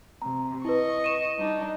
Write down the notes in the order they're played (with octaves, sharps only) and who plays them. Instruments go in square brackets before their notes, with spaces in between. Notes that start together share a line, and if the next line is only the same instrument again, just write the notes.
[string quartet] C3 [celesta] A#5
[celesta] E4 B4 [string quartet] D#5 C#6
[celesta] D#7 E7
[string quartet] G3 D4 D#4